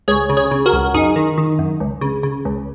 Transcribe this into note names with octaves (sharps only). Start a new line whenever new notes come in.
C#2 G#4 C#5
C#3
G#4 C#5
C#3
F#4 A#4
C#2
F#2 D#4 G#4
D#3
D#3
F#2
C#2
C#3
C#3
C#2